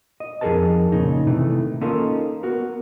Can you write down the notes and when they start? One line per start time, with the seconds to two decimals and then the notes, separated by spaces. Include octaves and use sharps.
0.20 D#5
0.41 F2 D#4 G#4 A#4 B4 A5
0.92 A#2 C#3 D#4
1.27 C3 D#3 E3 A3
1.81 A#3 C#4 D#4 F4 A4 A#4
2.43 B3 F#4 A#4